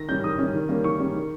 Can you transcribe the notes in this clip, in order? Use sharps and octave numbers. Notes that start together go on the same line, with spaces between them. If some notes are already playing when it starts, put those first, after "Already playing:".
Already playing: D#3 A#6
G3 C#4 G6
D#3 D#6
G3 C#4
D#3
G3 A#3 C#4
D#3 C#6
G3 A#3 C#4
D#3